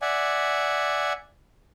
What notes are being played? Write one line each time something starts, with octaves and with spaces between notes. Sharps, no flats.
D5 E5 F#5 G#5